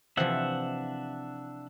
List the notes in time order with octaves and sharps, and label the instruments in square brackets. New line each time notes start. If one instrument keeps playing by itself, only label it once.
[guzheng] C3 E3 F3 [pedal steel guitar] D4 E5 F#5